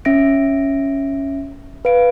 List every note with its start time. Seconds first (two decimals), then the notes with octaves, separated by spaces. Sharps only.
0.05 C#4 E5 A#6 D7
1.85 B4 F5 D7